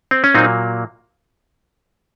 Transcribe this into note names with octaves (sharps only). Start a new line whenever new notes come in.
C4
C#4
A#2 F#3 A#3 C4 D#4